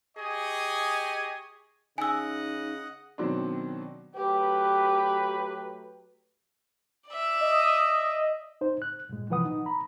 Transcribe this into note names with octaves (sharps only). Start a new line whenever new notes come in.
G4 G#4 D#5 G#5 C#6 D#6
C#3 D#4 D#5 F#5 G#5 E6
B2 D#3 F#3 C4 D4
F#3 A3 G4 B4
D5 E5
D#5
D#4 C5
F#6
G2 A#2 G#3
C3 E3 F3 B4 F#5 D#6
D#4
A#5 B5